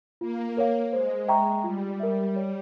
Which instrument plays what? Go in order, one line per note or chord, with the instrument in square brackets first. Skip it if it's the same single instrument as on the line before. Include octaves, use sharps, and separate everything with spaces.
[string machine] A#3 [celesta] F4
[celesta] A#4 C#5 F5
[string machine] G#3 [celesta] C5
[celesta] E5 G5 A#5 C#6
[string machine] G3 [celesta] F4
[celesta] A#4 E5
C#5